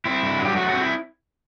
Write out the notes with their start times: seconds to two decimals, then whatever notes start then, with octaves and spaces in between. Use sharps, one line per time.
0.05 C4 E4
0.23 G2
0.39 F#3
0.45 G4
0.56 A3 F#4
0.69 C4 F#4
0.81 E4